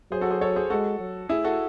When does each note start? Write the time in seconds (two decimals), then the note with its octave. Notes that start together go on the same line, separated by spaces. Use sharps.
0.11 F#3 G#4 C5
0.21 F#4 A4
0.31 G#4 C5
0.41 A4 C#5
0.56 G#4 C5
0.70 G#3 F#4 A4
1.00 F#3
1.29 A2 E4 G#4
1.44 F#4 A4